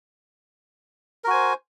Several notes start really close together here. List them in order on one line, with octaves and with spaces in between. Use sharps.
A#4 F#4 G#5 C5